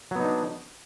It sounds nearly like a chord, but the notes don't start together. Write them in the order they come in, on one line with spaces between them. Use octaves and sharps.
F#3 B3 D#4 D4